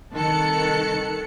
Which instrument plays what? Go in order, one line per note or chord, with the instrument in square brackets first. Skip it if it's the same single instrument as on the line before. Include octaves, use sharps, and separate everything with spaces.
[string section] C2 D#3 A4 A5 F#6 C#7